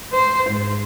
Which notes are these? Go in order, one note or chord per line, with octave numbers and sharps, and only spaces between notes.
C5
G#2